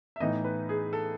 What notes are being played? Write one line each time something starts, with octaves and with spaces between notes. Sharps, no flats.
E5
A2 E3 B3 D#4 D#5
B4
G#4
A4